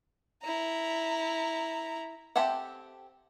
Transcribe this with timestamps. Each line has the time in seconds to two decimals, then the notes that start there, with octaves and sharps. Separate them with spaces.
0.43 E4 A#5
2.36 C4 G4 A4 E5 F#5